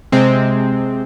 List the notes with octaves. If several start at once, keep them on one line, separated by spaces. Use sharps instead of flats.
C3 G#3 C4